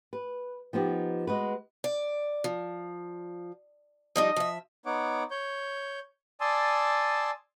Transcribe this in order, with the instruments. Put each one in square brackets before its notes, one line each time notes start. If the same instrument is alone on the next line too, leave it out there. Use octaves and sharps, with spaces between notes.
[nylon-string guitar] B4
F3 B3 D#4 G4
G#3 F#4 B4
[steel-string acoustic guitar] D5
F3
[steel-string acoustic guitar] F3 G3 D#4 [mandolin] D#5
[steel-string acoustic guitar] F3 E5
[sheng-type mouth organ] B3 D#4 C#5 F#5 D6
C#5 G6
D5 G#5 A5 C6 D#6 E6